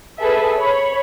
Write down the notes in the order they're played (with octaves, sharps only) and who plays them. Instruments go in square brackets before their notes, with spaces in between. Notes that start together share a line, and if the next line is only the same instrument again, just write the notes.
[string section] G#4 A4 B4 E5 A5
C#5 B5